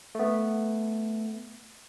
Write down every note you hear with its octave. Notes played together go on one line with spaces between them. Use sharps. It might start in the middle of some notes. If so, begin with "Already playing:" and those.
A3 B3